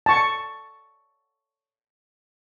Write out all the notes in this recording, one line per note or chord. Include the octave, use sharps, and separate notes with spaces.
A5 C#6